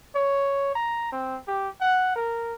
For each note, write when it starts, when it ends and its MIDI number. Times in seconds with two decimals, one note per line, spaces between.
0.15 0.73 73
0.75 1.09 82
1.12 1.37 60
1.48 1.69 67
1.81 2.11 78
2.16 2.53 70